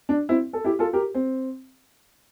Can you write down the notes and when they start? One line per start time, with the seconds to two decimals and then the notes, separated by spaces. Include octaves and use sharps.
0.09 D4
0.29 C4 E4
0.53 A4
0.64 E4 G4
0.79 F4 A4
0.93 G4 A#4
1.14 C4